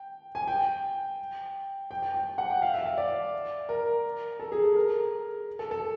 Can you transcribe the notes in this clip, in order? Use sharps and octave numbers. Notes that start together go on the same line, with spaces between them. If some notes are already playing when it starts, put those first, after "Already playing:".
Already playing: G5
G#5
G5
G5
G5
G5
F#5
G5
F5
E5
E5
D5
A#4
A4
G#4
A#4
A4
A4